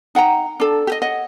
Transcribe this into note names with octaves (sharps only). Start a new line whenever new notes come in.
D#4 F#5 G5 A#5
D4 A4
G4 D#5
C#5 D#5 F#5